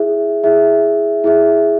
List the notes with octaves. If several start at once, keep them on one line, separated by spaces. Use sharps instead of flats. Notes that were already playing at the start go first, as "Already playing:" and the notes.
Already playing: E4 G#4 E5
E4 G#4 E5
E4 G#4 E5